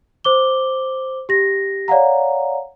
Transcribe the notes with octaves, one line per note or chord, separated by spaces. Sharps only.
C5 D6 G7
G4 A#6
C#5 D5 F5 F#5 A#5